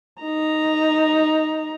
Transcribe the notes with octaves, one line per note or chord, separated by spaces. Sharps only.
D#4 A#5